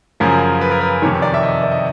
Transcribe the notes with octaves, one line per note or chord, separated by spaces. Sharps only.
F#2 C#3 F3 A#4
B4
A#4
B4
F2 C3 D#3 C#5
D5
E5
D#5
D5
D#5